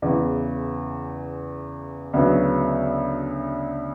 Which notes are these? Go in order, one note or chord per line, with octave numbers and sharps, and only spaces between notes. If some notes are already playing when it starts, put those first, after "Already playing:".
E2 C#3 E3
D2 C#3 F#3 B3